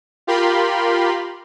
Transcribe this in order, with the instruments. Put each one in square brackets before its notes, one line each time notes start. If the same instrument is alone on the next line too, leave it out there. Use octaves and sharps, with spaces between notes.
[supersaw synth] F4 G4 A#4 B5 C6